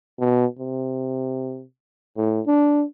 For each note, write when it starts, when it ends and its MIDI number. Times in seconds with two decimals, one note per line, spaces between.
0.20 0.46 47
0.59 1.63 48
2.17 2.41 45
2.47 2.84 62